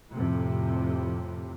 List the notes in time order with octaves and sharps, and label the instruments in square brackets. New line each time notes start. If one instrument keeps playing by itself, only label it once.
[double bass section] F2 A2 C3